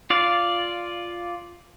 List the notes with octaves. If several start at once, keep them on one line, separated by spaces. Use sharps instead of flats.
F4 D5 F5